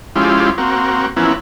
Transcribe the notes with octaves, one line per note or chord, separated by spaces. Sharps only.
F3 G#3 C#4 E4 F4 G4
A#3 C4 F#4
E3 F3 A#3 B3 C#4 E4